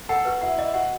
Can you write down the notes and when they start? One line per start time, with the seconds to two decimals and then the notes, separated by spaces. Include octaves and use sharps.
0.09 A4 F#5
0.25 F#4 B4
0.41 E4 F#5
0.58 E4 D#5
0.74 F#4 F#5